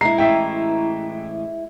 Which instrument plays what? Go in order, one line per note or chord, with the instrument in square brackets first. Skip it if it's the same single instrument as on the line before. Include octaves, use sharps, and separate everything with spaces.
[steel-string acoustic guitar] G#3 E4 [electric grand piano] A#5 [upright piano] C7
[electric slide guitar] A2 E3 [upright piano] E5 G5